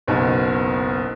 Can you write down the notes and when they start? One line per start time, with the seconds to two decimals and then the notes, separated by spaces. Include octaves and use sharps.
0.07 F#1 B1 B2